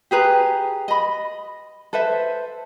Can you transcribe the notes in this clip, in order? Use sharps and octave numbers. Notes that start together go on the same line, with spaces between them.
G4 G#4 B4 A#5
D#5 B5
A4 B4 C5 E5